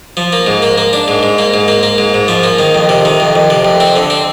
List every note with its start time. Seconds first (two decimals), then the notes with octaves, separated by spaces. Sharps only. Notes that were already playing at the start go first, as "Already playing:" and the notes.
0.17 F3
0.33 A#3
0.47 G#2
0.62 A#3
0.78 A#3
0.93 D4
1.08 G#2
1.23 G#2
1.38 A#3
1.54 G#2
1.68 A#3
1.83 A#3
1.98 G#2
2.14 G#2
2.28 F3
2.43 A#3
2.59 D#3
2.75 F2
2.89 C3
3.05 D#3
3.20 F2
3.36 F2
3.50 C3
3.65 F2
3.80 C4
3.96 D3
4.10 C4